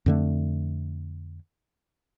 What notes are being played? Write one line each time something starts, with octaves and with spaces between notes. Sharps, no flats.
F2 D3 A3